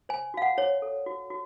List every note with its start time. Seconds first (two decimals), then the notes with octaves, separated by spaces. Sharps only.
0.09 C5 G#5
0.34 F#4 F5
0.42 F#5
0.58 C5 C#5
0.82 A4
1.07 F#4
1.30 F#4